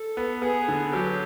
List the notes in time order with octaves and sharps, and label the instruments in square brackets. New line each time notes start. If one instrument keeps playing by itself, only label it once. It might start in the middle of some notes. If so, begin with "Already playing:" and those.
Already playing: [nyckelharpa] A4
[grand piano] B3
[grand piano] B3 [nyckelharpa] G#4
[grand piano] D3
[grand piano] F#3 [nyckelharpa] G4